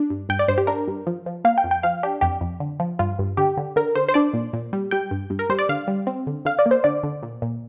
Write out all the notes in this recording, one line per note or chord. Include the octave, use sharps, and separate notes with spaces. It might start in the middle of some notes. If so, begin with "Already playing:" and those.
Already playing: D4
G2
G2 G5
D5
G2 C5
G4
D4 A#4
G2
F3
F3
A#3 F5
G5
F2
G5
F3 F5
D4 G4
F2 G4
F2
D3
F3
G2 F4
G2
D3 G4
D3
D3 A#4
D3 C5
C5
D4 D5
A#2
A#2
G3
G3 G5
G2
G2
A#4
G3 C5
D5
D3 F5
G3
C4
D3
D3 F5
D5
A#3
C5
D3 D5
D3
A#2
A#2